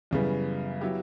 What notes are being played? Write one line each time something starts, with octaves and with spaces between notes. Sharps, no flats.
F#2 C#3 E3 G3 B3
F#3 B3 E4 G4